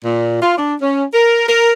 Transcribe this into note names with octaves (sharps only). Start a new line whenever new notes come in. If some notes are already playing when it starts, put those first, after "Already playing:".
A#2
F4
D4
C#4
A#4
A#4